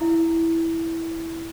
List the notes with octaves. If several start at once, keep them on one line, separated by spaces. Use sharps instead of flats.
E4 E5